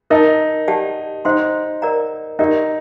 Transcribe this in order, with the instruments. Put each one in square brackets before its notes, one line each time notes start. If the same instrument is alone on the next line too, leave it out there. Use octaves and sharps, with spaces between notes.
[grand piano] D#4 [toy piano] A#4 D#5 A5
[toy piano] G4 D5 F#5 A5
[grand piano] D#4 [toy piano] C5 F#5 C6
[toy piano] A#4 D5 F#5 A#5
[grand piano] D#4 [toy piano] G4 A#4 D5 F#5